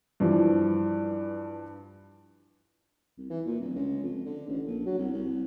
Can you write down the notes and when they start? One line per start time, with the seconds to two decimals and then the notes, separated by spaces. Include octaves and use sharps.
0.20 G2 E3 F3
3.18 C2
3.30 E3
3.46 A#2
3.60 D1
3.75 C#2
4.02 F2
4.25 D3
4.47 A1
4.67 A#1
4.85 F#3
4.98 C2
5.13 C2